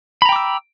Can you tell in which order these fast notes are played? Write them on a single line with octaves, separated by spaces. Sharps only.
B5 A#5 G5 D6 E6